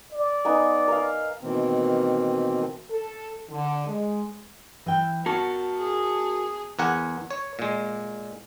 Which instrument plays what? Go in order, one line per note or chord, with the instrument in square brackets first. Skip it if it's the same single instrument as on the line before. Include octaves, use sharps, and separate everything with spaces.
[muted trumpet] D5
[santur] B3 D#4 G#5
A#4 F5
[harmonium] B2 D#3 E3 A#3 C4
[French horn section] A4
D3
G#3
[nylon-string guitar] E3 E5 G5
[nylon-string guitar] B3 [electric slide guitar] F#4 A#4 [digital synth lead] A5
[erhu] G#4
[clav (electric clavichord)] E2 A#4 F#5 G#5
C#5
A#2 G#3